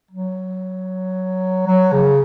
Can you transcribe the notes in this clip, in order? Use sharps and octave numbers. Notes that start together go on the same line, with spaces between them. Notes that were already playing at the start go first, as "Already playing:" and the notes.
F#3
F#3
C#3